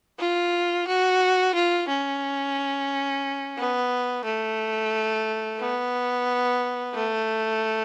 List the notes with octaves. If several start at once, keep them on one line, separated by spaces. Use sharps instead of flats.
F4
F#4
F4
C#4
B3
A3
B3
A3